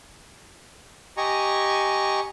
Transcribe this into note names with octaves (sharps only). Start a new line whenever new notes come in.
G4 D#5 G#5 A#5 C#6